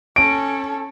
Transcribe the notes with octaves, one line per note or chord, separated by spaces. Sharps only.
C#4 A4 D7